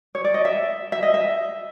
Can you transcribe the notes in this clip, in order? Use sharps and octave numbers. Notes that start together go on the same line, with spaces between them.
C#5
D5
D#5
E5
E5
D#5
E5